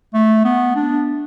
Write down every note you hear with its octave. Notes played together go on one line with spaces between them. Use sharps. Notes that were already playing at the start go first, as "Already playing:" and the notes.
A3
B3
D4